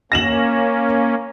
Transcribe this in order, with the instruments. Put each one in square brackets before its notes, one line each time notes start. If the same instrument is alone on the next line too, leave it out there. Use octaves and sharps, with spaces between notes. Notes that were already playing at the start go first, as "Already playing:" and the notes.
[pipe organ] A#3 C#4 [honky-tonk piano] A#6 E7 F#7